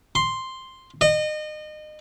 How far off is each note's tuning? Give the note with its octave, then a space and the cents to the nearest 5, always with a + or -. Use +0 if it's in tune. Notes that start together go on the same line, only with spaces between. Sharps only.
C6 +0
D#5 -30